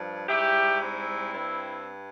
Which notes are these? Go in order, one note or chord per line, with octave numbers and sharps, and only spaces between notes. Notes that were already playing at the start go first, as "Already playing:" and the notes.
Already playing: G2 F3
G#2 G3 E4 G4
C4 E4
G2 G3